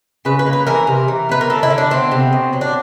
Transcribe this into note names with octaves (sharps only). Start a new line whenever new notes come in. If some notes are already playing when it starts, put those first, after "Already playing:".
C#3 B4
B4
A#3
B4
E3 A#4
C3
E3
B3 B4
A#4
D3 A4
E4
D3
D4
B3 C4
C3
B2
F#3
D4